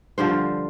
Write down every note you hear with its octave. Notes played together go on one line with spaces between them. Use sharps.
G2 D3 F3 C5